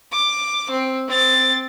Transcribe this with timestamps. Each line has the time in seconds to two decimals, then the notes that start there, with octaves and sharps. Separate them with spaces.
0.12 D6
0.71 C4
1.08 C4 A6